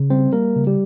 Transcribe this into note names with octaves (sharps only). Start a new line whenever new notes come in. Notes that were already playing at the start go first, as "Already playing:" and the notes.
Already playing: C#3
G3 C4 C5
G3 A#3 A#4
C#3
G3 G4